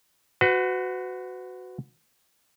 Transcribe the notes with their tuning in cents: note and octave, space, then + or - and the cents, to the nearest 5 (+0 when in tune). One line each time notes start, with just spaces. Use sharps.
F#4 -5 B4 +35